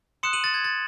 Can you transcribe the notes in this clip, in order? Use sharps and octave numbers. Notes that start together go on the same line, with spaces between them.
C6 D#6 F#6 C#7 E7
D#7 F#7
A6
G#6
A6